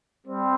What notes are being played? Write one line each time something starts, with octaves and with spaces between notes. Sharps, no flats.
G3 C4